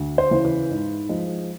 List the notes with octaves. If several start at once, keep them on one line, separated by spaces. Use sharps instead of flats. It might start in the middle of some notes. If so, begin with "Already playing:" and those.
Already playing: D2
C5
C#3 E3
B4
G#2
F3 G#3